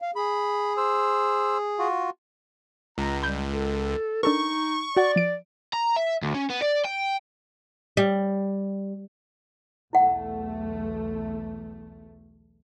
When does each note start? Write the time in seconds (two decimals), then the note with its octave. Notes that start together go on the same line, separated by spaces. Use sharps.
0.02 F5
0.16 G#4 B5
0.77 C5 E6
1.79 F4 F#4
2.98 C#2 A#5
3.23 G3 B5 G6
3.53 A4
4.23 D4 D#4 A4 A#4 C#6
4.96 F#4 D5 F#5
5.16 F3 D7
5.73 A#5
5.96 E5
6.22 D2
6.34 C#4
6.50 B3
6.62 D5
6.85 G5
7.97 G3
9.93 B1 E2 A3 E4 F#5